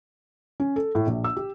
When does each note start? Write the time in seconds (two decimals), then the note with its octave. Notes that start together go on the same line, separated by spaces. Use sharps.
0.60 C#4
0.76 A4
0.95 A2
1.07 A#1
1.24 E6
1.37 G4